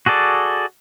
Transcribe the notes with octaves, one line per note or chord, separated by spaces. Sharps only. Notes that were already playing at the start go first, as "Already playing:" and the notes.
F#4 G#4 A4 D5